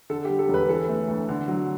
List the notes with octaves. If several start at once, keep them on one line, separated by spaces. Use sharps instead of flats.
D3 A4
G4
G3
A4
E1
B4
E3 A4
A3
D2
D3
F#3